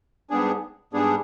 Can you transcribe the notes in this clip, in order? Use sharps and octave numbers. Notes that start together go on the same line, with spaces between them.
G#2 G3 B3 D4 G#4
G#2 G3 B3 D4 G#4